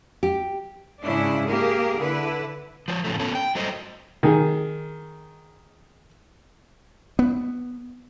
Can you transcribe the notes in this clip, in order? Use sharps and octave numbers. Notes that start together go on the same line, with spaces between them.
G4
G#2 C#3 C#4 D4 E4
A#3 G4 G#4 A#4
D3 E4 B4
F3 C5 C#5
A2 C#3 F3 A3
B3 C#4 A4
G5
F#3 G3 A3 C5 D#5
D#3 G#4
B3